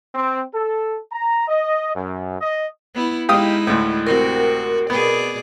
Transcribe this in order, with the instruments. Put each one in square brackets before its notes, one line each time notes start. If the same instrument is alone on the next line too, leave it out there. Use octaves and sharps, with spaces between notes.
[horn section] C4
A4
A#5
D#5
F#2
D#5
[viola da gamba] B3 E4
[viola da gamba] G#3 D#4 E4 [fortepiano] G4 F5 D#6
[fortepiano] D2 A2
[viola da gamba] C3 C4 F#4 [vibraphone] A#4
[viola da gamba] B2 G#4 D5 [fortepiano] B3